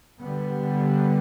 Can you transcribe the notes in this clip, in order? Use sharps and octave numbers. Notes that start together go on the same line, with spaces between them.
D3 G3 B3